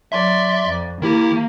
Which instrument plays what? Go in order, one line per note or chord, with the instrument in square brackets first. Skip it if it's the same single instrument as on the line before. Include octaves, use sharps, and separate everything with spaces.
[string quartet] F#3 D5 [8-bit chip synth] E5 C6
[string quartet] F2
[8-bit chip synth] D#3 E4 G4 [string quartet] A#3